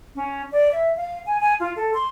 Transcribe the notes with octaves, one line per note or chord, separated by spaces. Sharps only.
C#4
D5
E5
F5
G#5
G#5
F4
A4
C6